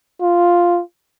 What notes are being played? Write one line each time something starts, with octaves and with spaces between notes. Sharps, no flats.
F4